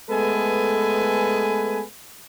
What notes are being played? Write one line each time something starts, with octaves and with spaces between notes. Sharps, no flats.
G#3 A3 B3 A4 B4 G#5